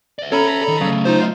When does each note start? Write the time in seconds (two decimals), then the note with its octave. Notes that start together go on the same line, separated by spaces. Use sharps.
0.19 D5 E5
0.32 C#4 A4 A#5 B5
0.68 D#3
0.81 C#3 F#3 A3
1.05 D#4 F4 C5